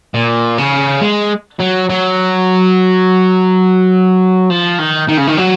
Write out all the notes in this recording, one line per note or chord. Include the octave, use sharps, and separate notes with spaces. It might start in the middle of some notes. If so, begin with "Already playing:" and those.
A#2
C#3
G#3
F#3
F#3
F3
D#3
D#3
C#3
D#3
F#3